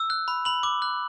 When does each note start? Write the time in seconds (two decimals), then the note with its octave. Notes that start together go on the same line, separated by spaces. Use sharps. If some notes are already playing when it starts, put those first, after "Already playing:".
Already playing: E6
0.10 F#6
0.28 B5
0.45 B5 F#7
0.63 D6
0.82 F#6